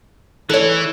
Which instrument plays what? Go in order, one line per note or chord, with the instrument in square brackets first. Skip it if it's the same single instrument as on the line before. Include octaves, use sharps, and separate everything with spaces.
[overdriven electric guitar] E3 [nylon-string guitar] A4 C#5